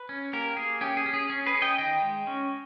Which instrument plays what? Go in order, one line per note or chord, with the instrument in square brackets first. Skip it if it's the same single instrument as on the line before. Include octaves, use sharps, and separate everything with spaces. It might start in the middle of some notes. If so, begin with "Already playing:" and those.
Already playing: [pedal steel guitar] B4
C#4
A#3 G4 A#4
A#3 G#4
C#4 G4
G#4
C#4
G#4
C#4
G#4 B4
C#4
D#5 G5
D#3 D#5 G5
G#3
C#4